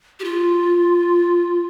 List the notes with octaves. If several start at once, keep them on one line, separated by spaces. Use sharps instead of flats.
G4
F4